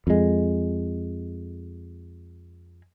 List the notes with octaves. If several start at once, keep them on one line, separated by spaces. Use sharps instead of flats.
F2 G#3